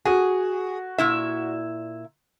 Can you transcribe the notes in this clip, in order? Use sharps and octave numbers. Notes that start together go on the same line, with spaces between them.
F#4 G#4
A#2 E4 E5